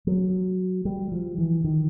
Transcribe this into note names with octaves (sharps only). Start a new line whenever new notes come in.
F#3
G3
F3
E3
D#3